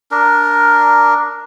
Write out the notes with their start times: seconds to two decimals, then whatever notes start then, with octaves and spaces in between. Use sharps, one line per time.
0.11 D4 A#4